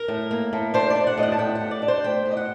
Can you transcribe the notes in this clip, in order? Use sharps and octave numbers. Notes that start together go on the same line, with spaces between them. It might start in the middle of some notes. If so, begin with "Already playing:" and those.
Already playing: A#4
A2
A#3
A2
D4 C5
D5
D4
F#5
A2 D#5
F#5
A5
A2 G5
F#5
A2
D5
D4
C5
A3 G5
A2
D#5
F#5